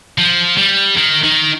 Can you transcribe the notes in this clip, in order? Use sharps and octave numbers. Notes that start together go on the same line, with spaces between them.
F3
G3
D#3
D#3